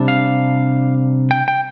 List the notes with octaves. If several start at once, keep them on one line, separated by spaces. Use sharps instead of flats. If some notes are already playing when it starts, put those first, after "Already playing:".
Already playing: C3 G3 D4
F5
G5
G5